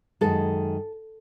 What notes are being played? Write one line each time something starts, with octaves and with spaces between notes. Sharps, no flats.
F#2 D#3 G#3 A4